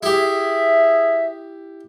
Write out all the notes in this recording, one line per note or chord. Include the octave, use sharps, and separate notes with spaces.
E4 G4 G#4 E5